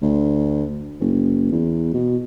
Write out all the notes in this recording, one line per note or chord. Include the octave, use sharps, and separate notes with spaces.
D2
F#1
E2
B2